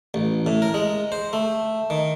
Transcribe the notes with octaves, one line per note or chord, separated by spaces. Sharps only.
A1
A2
A#4
G#3
C5
A3
D#3